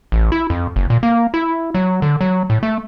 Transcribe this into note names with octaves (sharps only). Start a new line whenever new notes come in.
A1
E4
F2
F#1
A#2
A#3
E4
F#3
D3
F#3
A2
A3